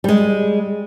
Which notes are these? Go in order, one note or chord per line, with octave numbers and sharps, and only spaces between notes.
G3 G#3